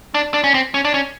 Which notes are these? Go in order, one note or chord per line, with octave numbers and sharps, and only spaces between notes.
D4
D4
C#4
C4
C#4
D4
C#4